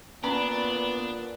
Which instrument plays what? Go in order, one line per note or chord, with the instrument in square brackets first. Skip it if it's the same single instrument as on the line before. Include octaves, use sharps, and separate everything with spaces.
[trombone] A#2 [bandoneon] B3 [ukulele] C#4 A#5 B5 [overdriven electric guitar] D4